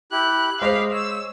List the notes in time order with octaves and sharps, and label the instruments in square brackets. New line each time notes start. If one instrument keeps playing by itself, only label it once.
[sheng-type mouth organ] E4 G4 [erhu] F#6
[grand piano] G#3 C5 [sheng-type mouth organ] D#5 B5 D6 [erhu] F5
[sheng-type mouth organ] C#5 [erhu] E6